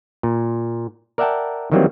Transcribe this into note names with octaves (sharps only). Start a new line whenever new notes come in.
A#2
A#4 D5 E5 F#5 G5 A5
D#3 E3 F#3 G3 A#3 C4